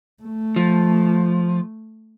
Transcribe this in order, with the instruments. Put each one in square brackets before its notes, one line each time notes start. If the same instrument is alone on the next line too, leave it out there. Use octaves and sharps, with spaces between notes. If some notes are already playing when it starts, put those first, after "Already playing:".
[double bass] A3
[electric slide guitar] F3